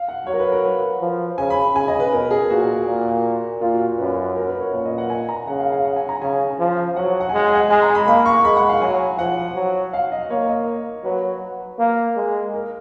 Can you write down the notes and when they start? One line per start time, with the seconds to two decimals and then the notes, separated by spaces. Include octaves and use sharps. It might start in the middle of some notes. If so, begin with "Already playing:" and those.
Already playing: F5
0.08 F#5
0.27 F#3 C#5
0.33 A#4
0.39 B4
0.52 A#4
0.64 B4
1.01 F3
1.38 C#3 G#5
1.50 B5
1.75 C#3 G#5
1.88 D#5
2.00 B4
2.12 B2 A#4
2.31 G#4
2.50 A#2 F#4
2.87 A#2
3.61 A#2 F4
3.74 F#4
3.98 F#2 B4
4.36 A#4
4.48 B4
4.61 C#5
4.73 A#2 C#5
4.86 D#5
4.98 F#5
5.10 G#5
5.29 A#5
5.47 C#3 F#5
5.60 F5
5.72 F5
5.85 F#5
5.96 G#5
6.09 A#5
6.22 C#3 G#5
6.59 F3
6.96 F#3 F#5
7.20 F#5
7.29 G#5
7.33 G#3 F#5
7.46 G#5
7.55 F#5
7.70 G#3 G#5
7.83 A#5
7.95 B5
8.07 A#3 B5
8.26 C#6
8.44 G#3 B5
8.57 F#5
8.69 F5
8.81 F#3 G#5
9.18 F3 F#5
9.56 F#3
9.93 F5
10.12 D#5
10.30 A#3 C#5
10.49 D#5
11.04 F#3 B4
11.79 A#3
12.16 G#3
12.54 A#4